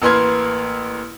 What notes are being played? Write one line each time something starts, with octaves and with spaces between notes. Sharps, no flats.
A1 A#3 B4 C6 F6 G#6